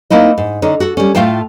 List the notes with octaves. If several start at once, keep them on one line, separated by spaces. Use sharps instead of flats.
A#3 C4 D#4 E4 D#5
G#2
D3 C#4 D#4
F#4 A4
G3 C#4
A2 A3 F4 F5 G5 A5